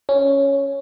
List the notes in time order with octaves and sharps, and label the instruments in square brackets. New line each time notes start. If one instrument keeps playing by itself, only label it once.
[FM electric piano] C#4